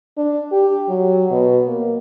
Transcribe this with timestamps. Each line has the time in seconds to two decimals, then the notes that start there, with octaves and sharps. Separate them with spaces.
0.17 D4
0.52 G4
0.89 F#3
1.31 B2
1.67 A#3